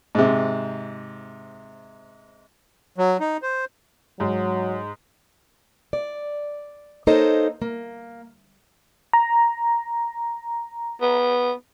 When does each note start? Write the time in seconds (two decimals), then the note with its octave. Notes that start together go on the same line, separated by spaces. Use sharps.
0.15 G#2 C3
2.98 F#3
3.20 D#4
3.42 C5
4.20 G#2 F#3
5.93 D5
7.07 A#3 D#4 A4 C5 C#5 D#5
7.62 A#3
9.13 A#5
11.01 B3